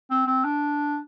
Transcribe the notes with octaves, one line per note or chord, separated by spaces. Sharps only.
C4
C4
D4